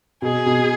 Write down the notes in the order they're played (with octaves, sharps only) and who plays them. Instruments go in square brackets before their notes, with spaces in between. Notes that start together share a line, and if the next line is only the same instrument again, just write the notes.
[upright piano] B2 [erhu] G#4
[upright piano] B2